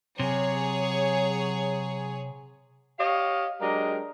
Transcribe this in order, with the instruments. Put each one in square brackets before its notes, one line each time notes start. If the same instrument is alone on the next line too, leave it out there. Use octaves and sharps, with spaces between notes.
[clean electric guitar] C3 [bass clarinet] F#3 [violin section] G#4 C#5
[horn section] G4 C#5 D#5 F5
F#3 G#3 D4 G4 A#4 D#5